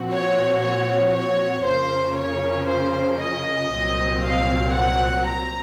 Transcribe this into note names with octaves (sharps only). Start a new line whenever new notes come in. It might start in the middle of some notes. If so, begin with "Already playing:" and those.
Already playing: A#2 F3 C4 F#4
C#5
C#5
C#5
F2 C#3 F3 A#3 C#4 C5
C#5
C5
D#5
C2 A#2 F#3 C4
F5
F#5
A#5